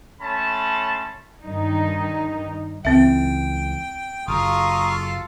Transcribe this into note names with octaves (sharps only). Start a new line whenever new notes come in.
A3 C#4 C#5 A5 B5 C6
G2 D#3 D#4
C#2 E3 C4 E5 G5
F#1 F4 A4 F5 A#5 C#6 D#6